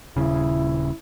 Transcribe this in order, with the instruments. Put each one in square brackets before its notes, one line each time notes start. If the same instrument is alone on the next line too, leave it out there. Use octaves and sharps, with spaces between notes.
[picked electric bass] D#1 C#3 [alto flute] E4